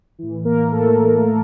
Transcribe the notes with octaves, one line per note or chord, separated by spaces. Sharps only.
A2 E3
A#3 A#4
A2 E3 A3 A4